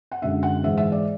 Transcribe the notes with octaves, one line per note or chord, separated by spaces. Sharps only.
F#5
F#2 D3 G#3 E5
F#5
G#2 E3 G#3 E5
E5
D5